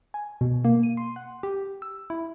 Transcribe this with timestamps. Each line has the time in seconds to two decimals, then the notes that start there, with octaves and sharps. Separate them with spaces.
0.14 G#5
0.41 B2
0.65 A#3
0.83 D#7
0.97 C6
1.16 F#5
1.43 G4
1.82 E6
2.10 E4